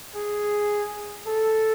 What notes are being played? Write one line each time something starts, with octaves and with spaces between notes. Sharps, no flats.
G#4
A4